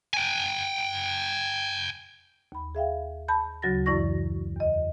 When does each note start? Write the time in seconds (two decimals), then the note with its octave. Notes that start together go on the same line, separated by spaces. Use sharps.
0.14 G5 G#5
2.52 D#2 B5
2.75 G#4 E5 F5 G5
3.28 A5 B5 G6
3.62 D2 C#3 F#3 F#4 A6 A#6
3.86 F#2 E3 E4 D5 C#6 A#6
4.56 E2 D#5